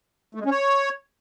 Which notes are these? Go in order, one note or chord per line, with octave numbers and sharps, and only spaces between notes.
A3
G#3
C#4
C#5